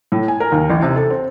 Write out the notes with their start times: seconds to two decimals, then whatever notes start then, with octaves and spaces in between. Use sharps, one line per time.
0.12 A2
0.28 G#5
0.40 A#4
0.52 D#2
0.70 A1
0.82 C3
0.96 A4
1.10 C4